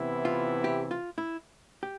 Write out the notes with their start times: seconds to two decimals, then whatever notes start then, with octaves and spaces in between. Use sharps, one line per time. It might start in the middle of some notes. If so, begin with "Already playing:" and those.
Already playing: C3 E3 B3 E4
0.25 F4
0.64 G4
0.91 F4
1.18 E4
1.83 G4